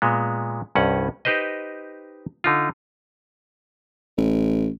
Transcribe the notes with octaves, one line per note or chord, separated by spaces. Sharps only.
A#2 G#3 B3
C2 G2 C#4 F#5
D#4 G4 B4 C5 D#5
D3 D#4 F4
A1